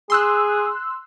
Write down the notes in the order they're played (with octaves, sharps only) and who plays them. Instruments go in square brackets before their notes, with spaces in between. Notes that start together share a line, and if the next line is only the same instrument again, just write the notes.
[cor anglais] G#4 [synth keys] C6 E6 F#6